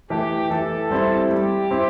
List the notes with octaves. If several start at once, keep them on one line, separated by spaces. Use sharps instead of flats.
E3 A3 G4
E3 A4
G3 C4 E4
G3 G4
C4 E4